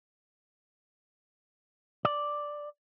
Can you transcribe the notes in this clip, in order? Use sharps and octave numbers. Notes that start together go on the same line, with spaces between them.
D5